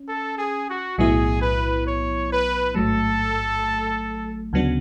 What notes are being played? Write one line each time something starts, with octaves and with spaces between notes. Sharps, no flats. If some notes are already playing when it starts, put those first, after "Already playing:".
Already playing: C#4
A4
G#4
F#4
B1 A2 F#3 B3 E4 G#4
B4
C#5
B4
A1 G#2 F#3 A3 A4
D2 C#3 F#3 B3 D4